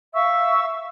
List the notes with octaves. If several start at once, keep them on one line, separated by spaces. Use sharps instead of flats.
E5 F5 C#6 E6